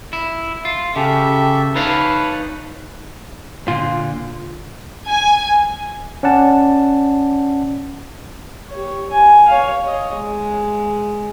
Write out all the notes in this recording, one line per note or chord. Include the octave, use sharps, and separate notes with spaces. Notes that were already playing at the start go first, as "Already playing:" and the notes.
E4
F4
C#3 G4 A4 E5
D#4 B4 C#5 F5 A5 B5
A#2 D3 F4
G#5
C#4 D5 F#5 A5
G4 C#5
G#5
C#5 F5
C#5 D#5
G#3